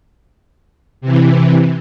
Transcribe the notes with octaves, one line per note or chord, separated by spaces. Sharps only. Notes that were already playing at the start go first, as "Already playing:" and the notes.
C3 E3